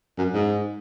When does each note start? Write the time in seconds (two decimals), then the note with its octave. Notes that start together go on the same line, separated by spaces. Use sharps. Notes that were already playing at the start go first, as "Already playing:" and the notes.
0.18 F#2
0.33 G#2